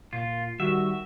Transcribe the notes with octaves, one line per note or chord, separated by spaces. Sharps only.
A#2 F4
D#3 G3 F#4 E5